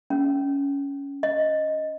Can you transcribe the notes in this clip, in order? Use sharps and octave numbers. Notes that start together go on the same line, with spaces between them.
C#4
D#5